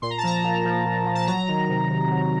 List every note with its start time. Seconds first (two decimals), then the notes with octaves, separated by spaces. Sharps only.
0.02 A#2 C6
0.10 A#5
0.18 A5
0.23 F3 A#5
0.44 A#2
0.65 F3
0.85 A#2
1.06 F3
1.15 A5
1.27 F#3 A#5
1.48 D#3
1.69 C3
1.90 C3
2.11 F#3